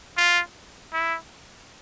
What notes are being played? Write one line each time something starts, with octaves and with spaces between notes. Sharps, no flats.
F4
E4